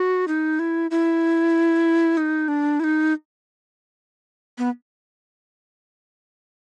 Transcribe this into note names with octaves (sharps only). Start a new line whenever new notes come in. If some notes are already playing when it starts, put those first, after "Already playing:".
Already playing: F#4
D#4
E4
E4
D#4
D4
E4
D#4
B3